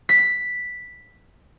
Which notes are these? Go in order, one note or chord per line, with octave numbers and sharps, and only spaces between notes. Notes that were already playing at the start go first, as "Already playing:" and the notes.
B6